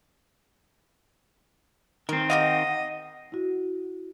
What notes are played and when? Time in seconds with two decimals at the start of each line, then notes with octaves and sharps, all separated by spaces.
2.09 D#3 C4 A#4
2.30 D#4 G4 D#5 F5 F#5
3.32 E4 F#4